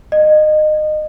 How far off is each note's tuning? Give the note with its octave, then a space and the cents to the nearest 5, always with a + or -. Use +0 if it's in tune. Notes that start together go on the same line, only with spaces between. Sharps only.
D#5 -25